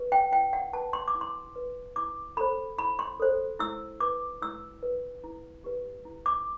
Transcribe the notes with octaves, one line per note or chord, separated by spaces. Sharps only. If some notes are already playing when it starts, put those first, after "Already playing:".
Already playing: G4 B4
G5
E4 G5
F#5
B4 A5
C6
D6
E4
C6
B4
E4 D6
A4 C5 B5
E4 B5
C6
A4 C5
E4 E6
B4 D6
E4 E6
B4
E4
G4 B4
E4
D6